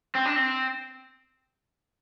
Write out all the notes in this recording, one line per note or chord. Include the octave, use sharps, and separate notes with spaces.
C4
D4
C4